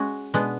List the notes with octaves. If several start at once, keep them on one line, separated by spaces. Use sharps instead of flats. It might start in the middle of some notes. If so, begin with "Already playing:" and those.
Already playing: G#3 C#4 F#4
B2 G#3 B3 D4